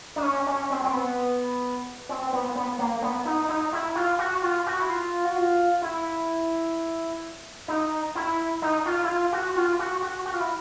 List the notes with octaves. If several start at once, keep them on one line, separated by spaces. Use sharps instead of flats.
D4
C#4
C#4
C4
C4
B3
C4
B3
B3
A#3
B3
D#4
D#4
E4
F4
F#4
F4
F#4
E4
F4
F#4
F4
E4
D#4
E4
D#4
F4
E4
F4
F#4
F4
F#4
F#4
F#4
F4
E4